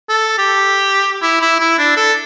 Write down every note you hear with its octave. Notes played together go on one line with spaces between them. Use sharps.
A4
G4
E4
E4
E4
D4
A4